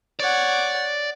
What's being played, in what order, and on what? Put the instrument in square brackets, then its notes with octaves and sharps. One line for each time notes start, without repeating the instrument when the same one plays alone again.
[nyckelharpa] C#5 F#5 [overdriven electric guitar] D5